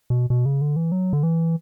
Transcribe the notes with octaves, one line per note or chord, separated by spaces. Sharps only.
B2
B2
C#3
D3
E3
F#3
D3
E3